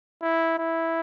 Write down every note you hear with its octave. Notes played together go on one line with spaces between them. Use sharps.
E4
E4